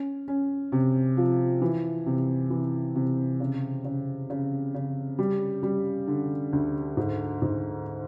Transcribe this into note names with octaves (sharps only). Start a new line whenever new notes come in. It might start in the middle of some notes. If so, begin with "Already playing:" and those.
Already playing: C#4
C#4
C3
F3
E3
C3
E3
C3
C#3
C#3
C#3
C#3
G3
G3
D3
D2
G#2
G#2